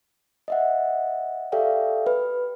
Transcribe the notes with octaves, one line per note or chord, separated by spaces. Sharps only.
D#5 E5 F#5
G4 A4 D5 E5 F5 G5
B4